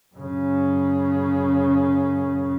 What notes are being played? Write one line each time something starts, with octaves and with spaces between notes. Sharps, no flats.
F#2 C#3